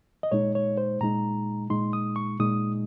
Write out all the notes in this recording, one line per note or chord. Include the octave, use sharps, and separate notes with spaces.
D#5
A#2 G#3 D#4 C#5
C#5
C5
A#2 G#3 D#4 A#5
A#2 G#3 D#4 C6
D#6
C#6
A#2 G#3 D#4 D#6